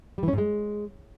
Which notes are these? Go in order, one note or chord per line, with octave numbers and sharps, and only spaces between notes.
G3
E3
C#4
G#2
G#3